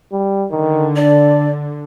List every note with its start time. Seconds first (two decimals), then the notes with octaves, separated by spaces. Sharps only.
0.12 G3
0.51 D3 D#3
0.96 D4 D5